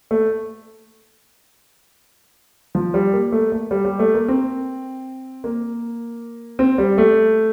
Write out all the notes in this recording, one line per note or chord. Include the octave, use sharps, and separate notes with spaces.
A3
F3
G3
A#3
A3
A3
G3
G3
A3
A#3
C4
A#3
C4
G3
A3